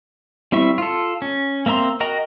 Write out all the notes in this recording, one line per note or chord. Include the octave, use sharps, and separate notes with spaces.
G3 C4 E4 E5 C#6
F4 A4
C#4
A#3 C4 E5 A#5 C6
F#4 A#4 D#5 G5 A#5